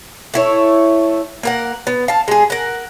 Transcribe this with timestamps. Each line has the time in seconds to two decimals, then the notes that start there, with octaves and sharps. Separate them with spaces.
0.34 A3 E4 C#5
1.43 A#3 A#4 F#5
1.87 B3
2.08 F5 A5
2.28 G#3 G#4
2.50 A#4 F#5